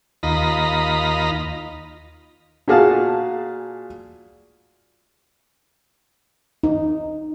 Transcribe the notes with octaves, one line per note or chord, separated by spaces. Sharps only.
D#2 F4 D#5 A#5 B5
A#2 F#4 G#4 F5 A5
D#4